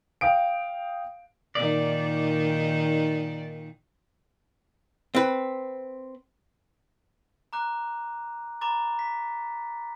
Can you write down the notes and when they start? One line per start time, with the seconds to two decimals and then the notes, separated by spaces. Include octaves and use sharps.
0.21 F5 G5 D#6 D7
1.55 A#2 D#3 D#4 D5
5.15 C4 B4
7.53 A#5 D6 F#6
8.61 A#5 B5 D6 A6
8.99 B6